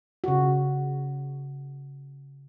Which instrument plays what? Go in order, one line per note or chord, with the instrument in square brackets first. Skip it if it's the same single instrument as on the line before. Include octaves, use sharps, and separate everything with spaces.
[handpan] C#3 F#4